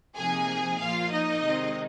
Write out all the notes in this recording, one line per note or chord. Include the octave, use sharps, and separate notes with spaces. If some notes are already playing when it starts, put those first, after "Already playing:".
C3 F3 A#3 D#4 G#4 G#5
A#2 F3 A#3 F4 F5
D#4 D#5
C3 D#3 G#3 C4